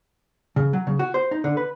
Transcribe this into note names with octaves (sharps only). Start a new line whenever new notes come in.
C#3
F#3
C#3
F#4
C5
D#4
D3
B4